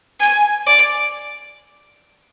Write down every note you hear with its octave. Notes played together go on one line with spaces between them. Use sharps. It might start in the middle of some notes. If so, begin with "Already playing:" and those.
G#5
D5